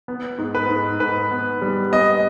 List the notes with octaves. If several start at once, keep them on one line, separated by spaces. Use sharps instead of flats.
B3
G#2
B4
G#2
G#2 B4
B3
G3
B3 D#5